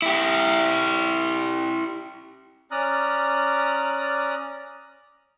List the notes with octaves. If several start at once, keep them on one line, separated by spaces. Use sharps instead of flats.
E4 G4
C#4 D5 A#5 D#6 F6 F#6